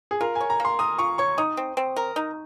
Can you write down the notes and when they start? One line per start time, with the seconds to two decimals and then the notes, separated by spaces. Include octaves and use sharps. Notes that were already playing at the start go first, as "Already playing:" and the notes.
0.11 G#4
0.21 F4 A#4
0.35 G#5
0.41 C#5
0.50 A#5
0.60 A#3 C6
0.79 A#4 D#6
0.98 F4 C#6
1.18 C#5 C#6
1.38 D#4 D#6
1.57 C4
1.77 C4
1.96 A#4
2.16 D#4